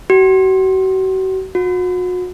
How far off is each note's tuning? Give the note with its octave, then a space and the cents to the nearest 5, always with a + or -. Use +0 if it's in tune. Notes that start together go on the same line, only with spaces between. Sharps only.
F#4 +40
F#4 -35